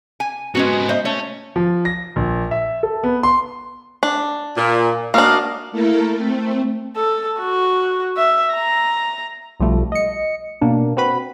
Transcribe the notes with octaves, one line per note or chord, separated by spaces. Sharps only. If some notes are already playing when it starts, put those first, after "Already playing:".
G#5
G#2 G#3 B3 C#4 F#4
C5 D#5 E5
A3 C#4
F3
A#6
A#1
E5
A4
B3
C6
D4
A#2
A#3 D4 F#4 D#5 F5
A3 A#3 E4 A4 A#4
A3 C4
A4
F#4
E5
A#5
B1 F3 G3 A3
D#5 C#7
B2 A#3 D4
C4 F#4 B4 B5